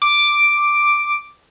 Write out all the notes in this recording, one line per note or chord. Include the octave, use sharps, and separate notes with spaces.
D6